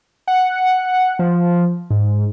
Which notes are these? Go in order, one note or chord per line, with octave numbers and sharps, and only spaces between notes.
F#5
F3
G#2